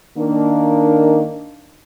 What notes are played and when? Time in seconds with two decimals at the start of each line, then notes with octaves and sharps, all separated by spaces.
0.17 D#3 A#3 D4